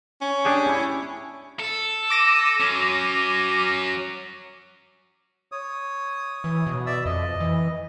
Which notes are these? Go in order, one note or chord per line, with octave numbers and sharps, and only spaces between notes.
C#4
D4 G4 G#4
E4
A4
D6 A#6 D#7
F#3 C#4
C#5 D#6
E3
B2
D5 E5 E6
F2 D#5
E3